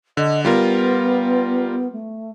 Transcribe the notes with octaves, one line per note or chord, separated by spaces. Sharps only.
D3 D#5
G3 B3 F4 A#4
A3